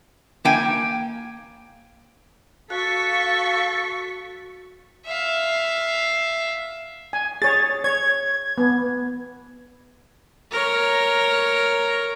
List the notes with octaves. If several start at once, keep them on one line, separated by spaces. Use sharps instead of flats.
A#3 G5 G#5
F#4 A4 F5 C#6 B6
E5 F5
G#5
G#4 C#5 A6
C#5 G#6
B3
A#4 C#5